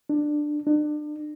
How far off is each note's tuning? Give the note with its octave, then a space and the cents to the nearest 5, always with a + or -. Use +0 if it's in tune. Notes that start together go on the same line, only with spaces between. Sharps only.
D4 +15
D4 +35